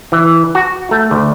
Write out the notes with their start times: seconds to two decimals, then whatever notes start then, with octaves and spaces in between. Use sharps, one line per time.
0.12 E3
0.55 F#4
0.91 A3
1.11 D2